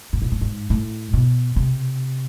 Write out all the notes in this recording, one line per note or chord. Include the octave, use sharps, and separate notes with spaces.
A2
A#2
A2
G#2
A2
B2
C3